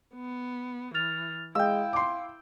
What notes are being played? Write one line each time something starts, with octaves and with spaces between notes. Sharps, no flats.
B3
E3 F6 A6 F7
G#3 E4 F5 G5 E6
C6 D6